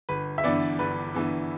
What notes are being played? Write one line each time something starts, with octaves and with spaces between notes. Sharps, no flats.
G1 B4
E5
G2 E3 B3 D5
G1 B4
G2 E3 B3